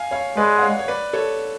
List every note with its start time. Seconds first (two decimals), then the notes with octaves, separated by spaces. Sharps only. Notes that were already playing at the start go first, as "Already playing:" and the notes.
Already playing: F5 G#5
0.11 C#5 F5
0.37 G#3 B4 D5
0.58 F#5
0.62 C#5 F5
0.79 C#5
0.88 B4 D5
1.13 A4 C#5